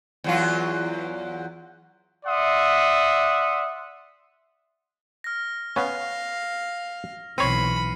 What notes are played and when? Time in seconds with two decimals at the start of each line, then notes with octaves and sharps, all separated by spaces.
0.24 E2 F#3 F4
2.26 D5 E5 F#5 C6 D#6
5.24 F6 A#6
5.76 B3 C#4 F5
7.38 B1 E3 C4 C#5 B5 C7 C#7 D#7